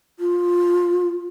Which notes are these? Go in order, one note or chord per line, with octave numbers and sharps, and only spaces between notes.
F4